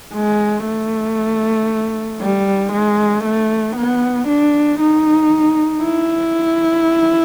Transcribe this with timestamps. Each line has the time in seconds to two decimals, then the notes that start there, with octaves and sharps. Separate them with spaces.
0.14 G#3
0.66 A3
2.21 G3
2.73 G#3
3.24 A3
3.77 B3
4.28 D4
4.80 D#4
5.84 E4